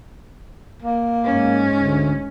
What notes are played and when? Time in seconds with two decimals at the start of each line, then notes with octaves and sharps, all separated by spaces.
0.82 A#3
1.25 G#2 C#4
1.80 D2